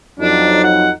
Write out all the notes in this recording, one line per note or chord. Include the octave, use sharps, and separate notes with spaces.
F2 F#3 D4 D#4
F#5